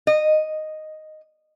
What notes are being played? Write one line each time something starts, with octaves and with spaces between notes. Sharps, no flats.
D#5